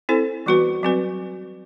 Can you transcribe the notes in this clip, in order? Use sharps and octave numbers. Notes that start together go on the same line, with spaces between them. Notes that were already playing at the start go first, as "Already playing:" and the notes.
C4 E4 A4 C5
E3 G3 B3 F#4 B4
F#3 C4 F#4 B4